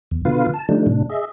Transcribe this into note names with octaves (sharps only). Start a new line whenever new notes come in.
E2
B2 D3 F4 B4 F5
A5
D3 F3 G3 A3 D4 D#4
A2 C3 D4
G#4 D#5 E5